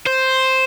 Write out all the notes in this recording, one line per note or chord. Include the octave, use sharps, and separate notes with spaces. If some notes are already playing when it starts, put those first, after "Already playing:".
C5